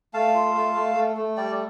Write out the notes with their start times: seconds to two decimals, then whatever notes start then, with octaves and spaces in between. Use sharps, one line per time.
0.13 A3 F5 A5
0.34 F4
0.55 A3
0.75 A3
0.95 A3
1.17 A3
1.37 G3 D5 G5